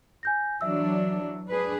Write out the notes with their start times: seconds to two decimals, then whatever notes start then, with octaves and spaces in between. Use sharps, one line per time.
0.23 G#5 G6 A#6
0.61 E3 F#3 D4 E5 E6
1.48 D4 G#4 B4